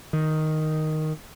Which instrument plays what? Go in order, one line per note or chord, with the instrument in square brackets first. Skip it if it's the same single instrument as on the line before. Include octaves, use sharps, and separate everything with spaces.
[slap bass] D#3